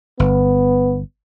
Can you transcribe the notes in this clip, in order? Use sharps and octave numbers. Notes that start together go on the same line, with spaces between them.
G1 B3